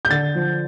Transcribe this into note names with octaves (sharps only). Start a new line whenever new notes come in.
G6
D3 A6
F3